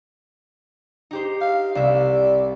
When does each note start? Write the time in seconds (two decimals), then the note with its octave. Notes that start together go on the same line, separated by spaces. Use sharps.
1.11 D#4 G4 C5
1.41 F5
1.75 C2 D5 E5